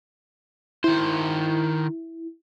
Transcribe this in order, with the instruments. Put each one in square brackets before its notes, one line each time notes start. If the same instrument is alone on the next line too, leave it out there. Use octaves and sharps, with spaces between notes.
[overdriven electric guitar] D#3 C5 [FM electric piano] E4